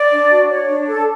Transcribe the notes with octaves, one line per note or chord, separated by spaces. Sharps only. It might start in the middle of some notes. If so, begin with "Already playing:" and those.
Already playing: D5
D4
F#4
C#5
D4
A4